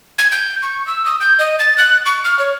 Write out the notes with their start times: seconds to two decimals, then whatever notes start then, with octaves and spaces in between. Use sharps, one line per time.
0.18 G#6
0.32 G6
0.63 C#6
0.87 E6
1.06 D#6
1.21 G6
1.39 D#5
1.59 A6
1.78 F#6
2.06 C#6
2.24 F6
2.39 C#5